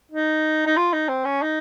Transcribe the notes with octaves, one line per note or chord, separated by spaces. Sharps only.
D#4
D#4
F4
D#4
C4
C#4
D#4